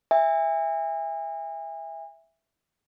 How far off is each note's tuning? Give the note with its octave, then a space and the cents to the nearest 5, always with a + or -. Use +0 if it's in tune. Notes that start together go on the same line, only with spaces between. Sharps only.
E5 +0 G#5 -35